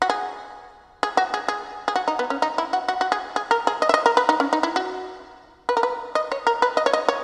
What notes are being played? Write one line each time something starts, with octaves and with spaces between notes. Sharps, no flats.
F#4
G#4
G#4
F#4
G#4
G#4
G#4
F#4
D#4
B3
C#4
D#4
E4
F#4
F#4
F#4
G#4
G#4
A#4
G#4
D#5
E5
D#5
A#4
B4
D#4
C#4
D#4
E4
F#4
B4
A#4
B4
D#5
C#5
A#4
B4
D#5
C#5
D#5
C#5